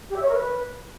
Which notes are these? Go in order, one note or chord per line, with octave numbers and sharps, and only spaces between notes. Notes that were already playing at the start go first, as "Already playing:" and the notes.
G4
E5
C#5
A#4
B4